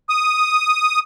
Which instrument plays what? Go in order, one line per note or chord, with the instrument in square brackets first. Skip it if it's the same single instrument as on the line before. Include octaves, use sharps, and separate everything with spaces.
[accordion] D#6